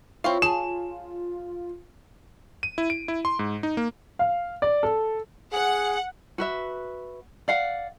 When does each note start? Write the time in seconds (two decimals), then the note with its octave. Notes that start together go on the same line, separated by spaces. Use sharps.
0.24 C4 E4 F4 C#5 F5 C#6
0.42 G#4 G#5 A5 E7
2.63 D#7
2.78 E4
2.90 D7
3.08 E4
3.25 C6
3.39 G#2
3.63 D#4
3.77 A#3
4.19 F5
4.62 D5
4.83 A4
5.53 G#4 F#5
6.38 F#4 B4 E5
7.48 D5 F5 F#5